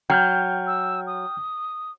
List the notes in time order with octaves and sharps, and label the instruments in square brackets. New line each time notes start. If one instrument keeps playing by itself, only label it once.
[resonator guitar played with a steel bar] F#3 [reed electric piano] G5 F6 G6
[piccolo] E6
D#6